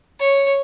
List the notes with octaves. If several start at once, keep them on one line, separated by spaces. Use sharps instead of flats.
C#5